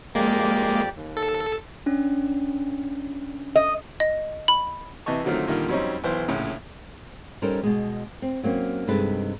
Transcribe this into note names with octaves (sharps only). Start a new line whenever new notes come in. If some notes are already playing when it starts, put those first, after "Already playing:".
F2 G#3 A#3 G4 D5
D#2
A4
C#4 D4
D#5
D#5
B5
C3 E3 D#5 A5 C#6
D3 D#3 F#3 A3 C4 F4
A#2 D3 D#3 G3 F4
F2 F#3 G3 C4 C#4 D#4
B1 E3 C5
A#1 A2 C#3
G3 C#4 D#4 A4 A#4 C5
B2 G#3
C4
F#3 A#3 C4 C#4
G2 C3 G#3 D#4 A4 B4